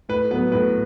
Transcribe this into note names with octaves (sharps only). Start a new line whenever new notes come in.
A2 B4
F#3 B3 B4
A2 B4